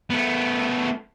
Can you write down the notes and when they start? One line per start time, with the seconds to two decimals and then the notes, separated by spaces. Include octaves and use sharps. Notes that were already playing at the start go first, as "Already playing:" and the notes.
0.10 A3 B3